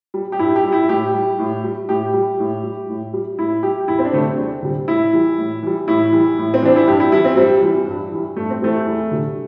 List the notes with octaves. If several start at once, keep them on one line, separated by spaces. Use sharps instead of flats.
G3
G4
G2 E4
G4
G3
E4
A2 G4
G3
A2
G3
A2 G4
G3
A2
G3
A2
G3
A2 E4
G3 G4
E2 E4
C4
D4
D3 G3 A3 C4
E2
D3 G3
A2 E4
E3 G3
A2
E3 G3
A2 E4
E3 G3
A2
C4
E3 G3 D4
E4
G2 G4
E4
E3 G3 E4
C4
G2 G3
E3 G3
G2
E3 G3
G2 A3
C4
E3 G3 A3
E2
D3 G3